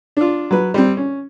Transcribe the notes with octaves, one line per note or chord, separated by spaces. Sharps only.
D4 F4
F#3 B4
G3 C4
C#4